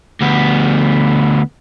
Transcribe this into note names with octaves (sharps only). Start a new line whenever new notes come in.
D2 B3